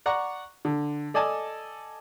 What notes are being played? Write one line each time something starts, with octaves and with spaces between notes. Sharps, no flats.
D5 F#5 A#5 C#6
D3
A4 D5 D#5 G#5 A5